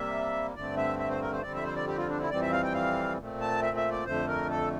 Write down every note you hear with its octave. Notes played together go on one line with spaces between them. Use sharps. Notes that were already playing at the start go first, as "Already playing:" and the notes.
Already playing: C3 G3 A#3 E5
G2 D3 A3 C4 D5
E5
E5
C5
A#4
C5
F2 D3 G3 C4 D5
E5
C5
D5
G4
F4
D4
E4
F2 E3 G3 C4 D5
E5
F5
G5
F5
A#2 A3 C4
A5
E5
E5
D5
F2 D3 A3 C5
A#4
A4